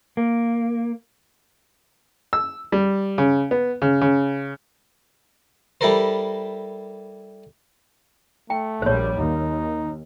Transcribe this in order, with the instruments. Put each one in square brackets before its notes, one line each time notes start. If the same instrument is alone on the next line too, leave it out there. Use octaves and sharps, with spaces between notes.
[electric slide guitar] A#3
[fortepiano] E6
G3
C#3
B3
C#3
C#3
[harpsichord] G3 E4 G4 A4 A#4 C5
[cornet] A3 [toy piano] G5
[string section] A#1 G3 [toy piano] C5 C#5
[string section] D#2 [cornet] D#4